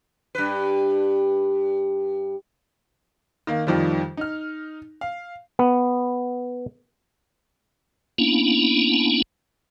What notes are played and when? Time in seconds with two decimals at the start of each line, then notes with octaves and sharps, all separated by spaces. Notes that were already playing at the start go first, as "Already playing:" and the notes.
0.35 G2 B4
3.47 D#3 A#3
3.67 F2 D#3 F3 G3
4.17 D#4 F6
5.01 F5
5.59 B3
8.18 A#3 B3 C#4 D4 E4